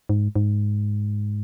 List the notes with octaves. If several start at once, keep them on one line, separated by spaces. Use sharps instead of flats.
G#2
G#2